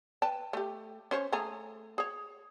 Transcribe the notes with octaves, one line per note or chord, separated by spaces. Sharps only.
B4 G5 A5
A3 G4
C#4 C5 C#5
A3 G#4 A#5
G#4 C#5